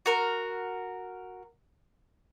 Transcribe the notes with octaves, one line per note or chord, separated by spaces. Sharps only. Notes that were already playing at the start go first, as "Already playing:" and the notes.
F#4 A#4